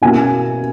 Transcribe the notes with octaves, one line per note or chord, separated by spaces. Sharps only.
B2 A#3 C#4 E4 G#5